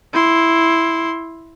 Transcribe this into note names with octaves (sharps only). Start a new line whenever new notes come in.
E4 C6